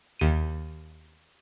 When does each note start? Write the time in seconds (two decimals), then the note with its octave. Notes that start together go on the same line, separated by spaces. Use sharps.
0.19 D#2 D#7